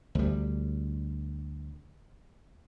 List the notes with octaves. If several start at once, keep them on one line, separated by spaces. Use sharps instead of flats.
D2 G3